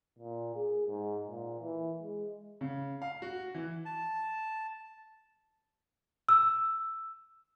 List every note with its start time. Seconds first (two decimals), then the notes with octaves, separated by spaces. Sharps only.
0.19 A#2
0.55 G#4
0.88 G#2
1.27 A#2
1.60 E3
2.02 G#3
2.61 C#3
3.02 F5
3.22 F#4
3.55 E3
3.85 A5
6.29 E6